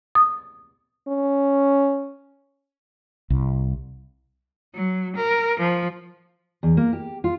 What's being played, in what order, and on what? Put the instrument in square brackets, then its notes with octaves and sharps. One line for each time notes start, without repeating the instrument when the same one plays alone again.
[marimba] D#6
[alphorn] C#4
[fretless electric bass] C2
[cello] F#3
A#4
F3
[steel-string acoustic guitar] E2
A#3
G4
F4